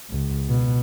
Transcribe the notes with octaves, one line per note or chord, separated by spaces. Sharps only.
C#2
B2